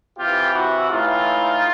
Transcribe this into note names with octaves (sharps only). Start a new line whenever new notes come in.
C3 E3 F4 G4
E4 F#4
A2 E3 D#4 F4